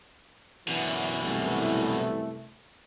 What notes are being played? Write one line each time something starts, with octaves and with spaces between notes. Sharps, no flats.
F#2 B2 D3 E3
C2 A3